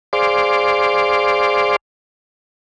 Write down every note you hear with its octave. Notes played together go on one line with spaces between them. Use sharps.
G#4 C5 D5 F5 C6 D6